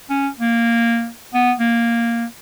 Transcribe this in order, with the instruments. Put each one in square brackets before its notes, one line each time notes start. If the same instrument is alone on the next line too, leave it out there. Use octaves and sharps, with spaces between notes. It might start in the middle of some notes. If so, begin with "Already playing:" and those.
[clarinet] C#4
A#3
B3
A#3